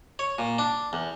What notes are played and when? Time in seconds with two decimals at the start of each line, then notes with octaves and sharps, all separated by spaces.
0.19 C#5
0.39 A#2
0.58 D4
0.93 E2